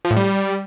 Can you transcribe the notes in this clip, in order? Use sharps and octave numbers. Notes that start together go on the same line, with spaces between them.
F3
A2
G3